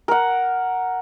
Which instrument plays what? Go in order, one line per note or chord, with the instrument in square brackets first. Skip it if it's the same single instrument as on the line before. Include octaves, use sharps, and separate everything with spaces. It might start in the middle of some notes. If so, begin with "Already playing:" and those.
[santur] A#4 F#5